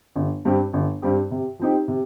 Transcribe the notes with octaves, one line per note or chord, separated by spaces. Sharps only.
G1
G2 G3 C4 G4
G1
G2 G3 C4 G4
C3
F3 C4 D#4 G4
C3